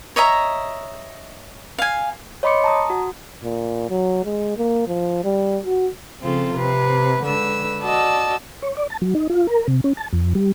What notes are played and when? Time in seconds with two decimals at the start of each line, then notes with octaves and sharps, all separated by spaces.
0.16 C#5 D#5 E5 A#5
1.79 F5 G#5
2.43 C#5 D#5 B5 C6 D6 C#7
2.64 A5 A#5 D#6
2.90 F#4
3.44 A#2
3.90 F#3
4.25 G#3
4.58 A#3
4.88 F3
5.24 G3
5.66 F#4
6.21 C#3 F3 C4 F4 A4
6.54 C3 C4 B4
7.24 D3 G#3 B4 E6
7.83 F#4 D5 D#5 A5 E6
8.62 C#5
8.77 D5
8.90 A5
9.02 F#3
9.15 D#4
9.30 F4
9.47 A#4
9.68 C3
9.84 C#4
9.97 A5
10.13 F2
10.35 G3